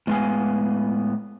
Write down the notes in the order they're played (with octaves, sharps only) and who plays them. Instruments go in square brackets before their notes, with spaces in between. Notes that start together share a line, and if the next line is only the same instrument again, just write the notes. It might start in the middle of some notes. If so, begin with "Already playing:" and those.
[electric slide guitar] A2 G#3 B3 E5 F5 G#5